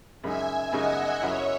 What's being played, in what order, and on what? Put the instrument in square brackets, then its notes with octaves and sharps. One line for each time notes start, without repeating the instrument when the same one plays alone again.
[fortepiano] F#2 C#3 G#3 D#4 [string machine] E5 G#5
[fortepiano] F#2 C#3 G#3 D#4 [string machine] D#5 F#5
[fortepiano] F#2 C#3 F#3 C#4 E4 [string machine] C#5 E5